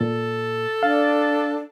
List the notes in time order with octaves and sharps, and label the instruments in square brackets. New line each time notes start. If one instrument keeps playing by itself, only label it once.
[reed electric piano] A#2 [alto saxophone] A4
[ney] D4 [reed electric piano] F5